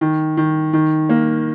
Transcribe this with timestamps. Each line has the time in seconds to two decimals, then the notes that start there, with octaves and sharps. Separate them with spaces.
0.01 D#3
0.37 D#3
0.73 D#3
1.09 A#3